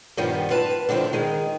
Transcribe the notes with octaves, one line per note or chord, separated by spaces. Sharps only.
G2 A#2 D#3 F3 G3 B3
F4 B4 A5
D3 D#3 F3 C4 E4
D#3 G#3